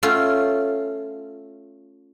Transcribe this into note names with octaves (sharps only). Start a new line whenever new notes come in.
A3 C#4 F4